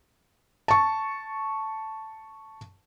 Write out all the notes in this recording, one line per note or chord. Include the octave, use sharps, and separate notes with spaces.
A5 C#6